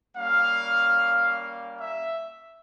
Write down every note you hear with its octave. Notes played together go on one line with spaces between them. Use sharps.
G3 A#3 C#4 F5
E5